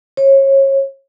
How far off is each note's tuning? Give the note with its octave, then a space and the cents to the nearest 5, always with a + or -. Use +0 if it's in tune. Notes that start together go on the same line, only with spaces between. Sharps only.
C#5 -30